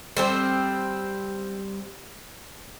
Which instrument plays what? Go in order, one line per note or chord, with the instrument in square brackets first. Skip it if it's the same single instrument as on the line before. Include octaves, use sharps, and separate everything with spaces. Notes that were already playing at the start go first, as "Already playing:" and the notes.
[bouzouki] G3 C4 G5